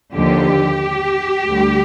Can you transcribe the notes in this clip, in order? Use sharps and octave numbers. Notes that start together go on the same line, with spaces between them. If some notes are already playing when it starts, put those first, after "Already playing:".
D#2 D3 F3 G4
D2 D3 G3